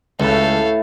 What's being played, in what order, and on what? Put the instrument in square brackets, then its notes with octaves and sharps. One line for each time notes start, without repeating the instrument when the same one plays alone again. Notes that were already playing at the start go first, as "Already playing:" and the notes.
[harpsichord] C#2 [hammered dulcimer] A2 A3 B4 [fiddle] A4 F5